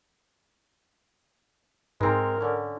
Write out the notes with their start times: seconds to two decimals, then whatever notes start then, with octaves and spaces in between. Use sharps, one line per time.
2.01 G#2 G#3 C4 A#4
2.41 D3 C#4